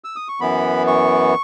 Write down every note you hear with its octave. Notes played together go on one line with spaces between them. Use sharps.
E6
D#6
C#6
F#2 E3 B3 B5
C#6